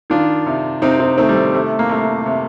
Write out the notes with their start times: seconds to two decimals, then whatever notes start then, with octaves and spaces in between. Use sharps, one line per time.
0.10 D#3 D4 F4
0.47 C3
0.82 C3 C4 D#4
1.00 C4 D#4
1.18 D#3 A3 C4
1.29 G3
1.36 A3
1.54 C3 A3
1.79 A#3
1.89 C3 A3
2.26 C3